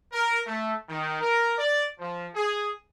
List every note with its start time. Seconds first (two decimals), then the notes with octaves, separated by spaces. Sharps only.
0.12 A#4
0.46 A3
0.88 D#3
1.21 A#4
1.58 D5
1.98 F3
2.34 G#4